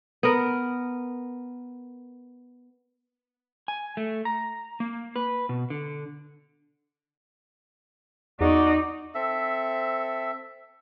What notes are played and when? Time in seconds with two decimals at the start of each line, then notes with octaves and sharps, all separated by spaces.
0.23 B3 A#4
3.68 G#5
3.97 A3
4.25 A#5
4.80 A#3
5.15 B4
5.49 B2
5.70 D3
8.41 E2 D#4 F#4 D5
9.15 C4 A4 E5